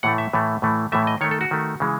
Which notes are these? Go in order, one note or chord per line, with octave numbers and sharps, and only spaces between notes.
A2 E3 A3 F#5
E5
A2 E3 A3
A2 E3 A3
A2 E3 A3 E5
D#5
D#3 A3 C#5
A4
F#4
D#3 A3
C#3 E3 G#3